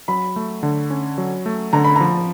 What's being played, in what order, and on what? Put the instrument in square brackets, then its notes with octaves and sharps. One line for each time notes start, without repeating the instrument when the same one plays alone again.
[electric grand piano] F#3 [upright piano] B5
[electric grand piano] A3
D3
C#4
F#3
A3
[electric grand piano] D3 [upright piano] A#5
[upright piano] B5
[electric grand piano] F3 [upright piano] A#5